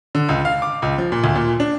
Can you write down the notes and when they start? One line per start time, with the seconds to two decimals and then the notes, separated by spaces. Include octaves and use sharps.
0.15 D3
0.29 C#2
0.45 F5
0.62 D6
0.82 C#2
0.98 F3
1.12 A#2
1.24 D2
1.35 A#2
1.60 D4